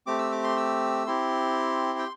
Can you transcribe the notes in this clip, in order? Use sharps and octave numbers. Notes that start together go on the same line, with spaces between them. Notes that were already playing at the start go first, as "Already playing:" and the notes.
A3 C4 G4 D6
E6
D6
C6
E6
C4 E4 G4 C6
G5